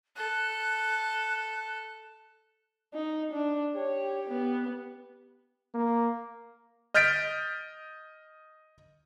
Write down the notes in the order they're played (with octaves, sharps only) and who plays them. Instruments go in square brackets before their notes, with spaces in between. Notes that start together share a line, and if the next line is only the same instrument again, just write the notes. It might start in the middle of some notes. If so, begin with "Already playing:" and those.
[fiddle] A4 [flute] F#6
[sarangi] D#4
D4
[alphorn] G4 [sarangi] C#5
[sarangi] B3
[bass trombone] A#3
[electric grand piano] D#5 F6 G6 A6 B6 D7